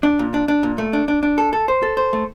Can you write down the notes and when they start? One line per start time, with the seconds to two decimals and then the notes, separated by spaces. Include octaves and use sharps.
0.03 D4
0.19 A#2
0.34 D4
0.48 D4
0.63 A#2
0.78 A3
0.93 D4
1.08 D4
1.23 D4
1.38 A4
1.53 A4
1.68 C5
1.83 A4
1.97 C5
2.13 A3